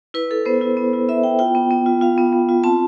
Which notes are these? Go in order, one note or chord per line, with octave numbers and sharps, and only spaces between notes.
E4 B4
E4 A4
B3 C5
E4
B3
E4
E4 E5
B3 G5
F4 G5
B3
B3
F4
F4 F5
B3
B3
F4
C4 A5